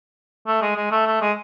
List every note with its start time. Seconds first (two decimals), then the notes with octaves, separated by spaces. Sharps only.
0.48 A3
0.62 G#3
0.76 G#3
0.91 A3
1.07 A3
1.21 G#3